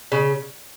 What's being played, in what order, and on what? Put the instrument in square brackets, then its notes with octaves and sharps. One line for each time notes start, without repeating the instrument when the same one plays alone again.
[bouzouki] C#3